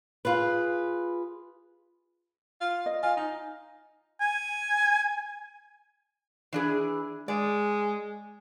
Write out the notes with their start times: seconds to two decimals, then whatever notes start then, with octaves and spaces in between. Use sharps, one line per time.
0.25 F4 G#4 B4
2.61 F4
2.86 D#5
3.03 F4 G#5
3.17 D#4
4.21 G#5
6.53 E3 D4 G#4
7.28 G#3 D5